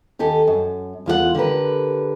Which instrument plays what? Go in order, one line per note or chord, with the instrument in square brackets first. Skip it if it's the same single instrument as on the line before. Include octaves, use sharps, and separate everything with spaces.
[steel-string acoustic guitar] D#2 G4 A4 G#5
F#2
E2 F4 G4 F#5
D3 G4 A#4 B4